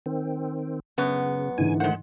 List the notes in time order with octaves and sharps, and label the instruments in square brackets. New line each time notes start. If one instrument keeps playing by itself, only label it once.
[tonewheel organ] D#3 C4
[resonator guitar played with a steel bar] F#2 B3 [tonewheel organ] C#3
[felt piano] G#2 D3 E3 [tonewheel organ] G#5
[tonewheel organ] D#3 A3 C5 [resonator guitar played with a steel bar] G#3 F#5